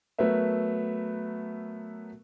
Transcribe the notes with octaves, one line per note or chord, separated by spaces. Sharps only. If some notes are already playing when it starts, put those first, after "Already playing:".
F#3 A3 B3 A#4 B4 E5